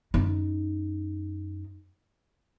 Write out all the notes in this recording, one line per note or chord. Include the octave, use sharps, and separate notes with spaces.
F#2 D#4